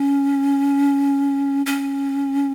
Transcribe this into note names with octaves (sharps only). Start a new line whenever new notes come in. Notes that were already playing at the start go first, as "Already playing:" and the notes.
Already playing: C#4
C#4